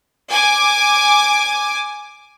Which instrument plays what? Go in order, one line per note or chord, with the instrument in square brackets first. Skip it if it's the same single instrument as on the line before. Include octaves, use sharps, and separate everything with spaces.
[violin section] G#5 D6